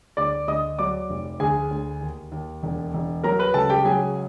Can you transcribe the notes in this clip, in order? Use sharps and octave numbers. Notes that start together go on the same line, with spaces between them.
D2 D5 D6
D2 D#5 D#6
F#3 D5 D6
F1
D2 G#4 G#5
D2
D#2
D#2
E1
E1
F#3 A#4 A#5
B4 B5
C#2 A4 A5
G4 G5
F#3 G#4 G#5